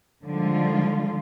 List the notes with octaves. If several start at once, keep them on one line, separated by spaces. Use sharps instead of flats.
D3 D#3 F3 G3 G#3 F4